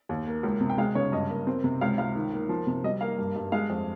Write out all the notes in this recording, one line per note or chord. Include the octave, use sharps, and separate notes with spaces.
D#2
A#3
C#2
C3
G5
G#3 F5
C#3 C#5
G2 D#5
A#3
C4
C3
C#2 F5
C#2 F5
D#3
A#3
F3
C3
G3 D#5
A#3 F5
G2
G2
G#3 F5
F2